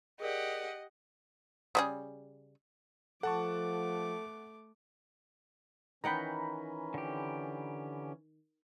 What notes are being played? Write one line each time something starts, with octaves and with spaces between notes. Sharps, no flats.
G4 G#4 A#4 D5 D#5 F#5
C#3 G3 G#4
F3 A3 A4 F#5 A5 C#6 D6
D#3 E3 C#4 F#5 G5 A#5 B5
D3 G4